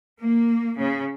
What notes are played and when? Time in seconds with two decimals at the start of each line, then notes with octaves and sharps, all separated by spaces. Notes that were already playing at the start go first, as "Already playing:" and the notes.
0.21 A#3
0.77 C#3